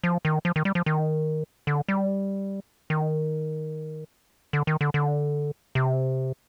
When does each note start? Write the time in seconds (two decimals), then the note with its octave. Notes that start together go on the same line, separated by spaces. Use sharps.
0.04 F3
0.25 D#3
0.45 F3
0.56 D#3
0.65 G3
0.75 F3
0.86 D#3
1.67 D3
1.88 G3
2.90 D#3
4.53 D3
4.67 D#3
4.81 D3
4.94 D3
5.75 C3